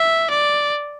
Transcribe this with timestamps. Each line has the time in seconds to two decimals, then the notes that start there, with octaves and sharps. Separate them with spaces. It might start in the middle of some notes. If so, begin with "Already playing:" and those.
Already playing: E5
0.30 D5